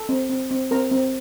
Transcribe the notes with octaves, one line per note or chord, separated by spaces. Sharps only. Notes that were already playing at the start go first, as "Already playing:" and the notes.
Already playing: A4 A5
C4
C4
C4
C4 A#4 A#5
C4